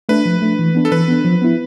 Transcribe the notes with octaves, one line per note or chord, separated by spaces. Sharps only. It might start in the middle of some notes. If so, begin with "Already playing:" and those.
A3 D4 B4
F3
A3 D4
E3
B3 D4
A4
E3 B4
B3 D4
F3
B3 E4